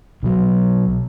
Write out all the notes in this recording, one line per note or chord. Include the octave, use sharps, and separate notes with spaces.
B1 B2 F#3